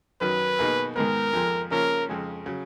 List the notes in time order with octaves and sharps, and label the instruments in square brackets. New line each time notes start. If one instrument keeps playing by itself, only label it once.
[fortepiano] F#2 D#3 F#3 [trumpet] B4
[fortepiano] B2 A#3 D#4 G#4
[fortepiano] G#2 D#3 G#3 B3 [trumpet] A#4
[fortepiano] F2 F3 G#3
[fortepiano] C#3 F3 A#3 C#4 [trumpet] A#4
[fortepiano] F2 C#3 G#3
C#3 F#3